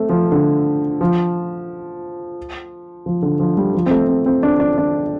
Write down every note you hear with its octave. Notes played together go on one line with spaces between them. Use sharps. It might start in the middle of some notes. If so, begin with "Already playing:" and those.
Already playing: A3 C4
F3
D3
F3
F3
D3
F3
G3
F3
C4
A3
C4
C4
D4
D4
D4